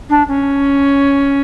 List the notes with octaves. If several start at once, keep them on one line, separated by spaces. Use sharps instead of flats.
D4
C#4